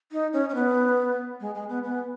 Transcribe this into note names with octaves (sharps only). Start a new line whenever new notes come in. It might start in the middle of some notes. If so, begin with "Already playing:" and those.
D#4
C#4
C#4
B3
G#3
G#3
B3
B3